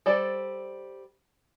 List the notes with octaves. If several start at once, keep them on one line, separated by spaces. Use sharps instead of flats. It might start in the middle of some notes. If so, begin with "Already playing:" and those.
G3 A4 C5 D5